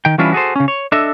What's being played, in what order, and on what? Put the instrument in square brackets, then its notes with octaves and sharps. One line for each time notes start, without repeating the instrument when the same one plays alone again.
[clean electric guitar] D#3 G5
E3 G3 C#4 D4 E4 F4
F#4 G#4 A4 C5
C#3 C#4
C#5
D4 A4 D#5 E5